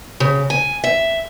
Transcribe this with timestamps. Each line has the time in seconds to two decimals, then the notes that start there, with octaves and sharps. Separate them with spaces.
0.20 C#3
0.50 G#5
0.84 E5